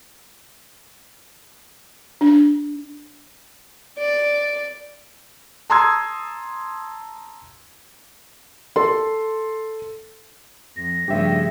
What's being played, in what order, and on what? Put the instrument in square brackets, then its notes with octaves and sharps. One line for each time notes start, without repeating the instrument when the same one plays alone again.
[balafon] D4
[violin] D5
[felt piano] A5 A#5 C6 D#6 E6 G#6
A4 C6
[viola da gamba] F2 [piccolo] A#6
[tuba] G2 [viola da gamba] C#3 F3 A3 [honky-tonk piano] G4 E5